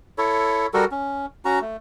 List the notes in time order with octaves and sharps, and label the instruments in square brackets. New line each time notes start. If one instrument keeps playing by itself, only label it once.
[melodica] E4 A4 C#5
G3 F#4 A4 A#4
C#4
C#4 F#4 A#5
A3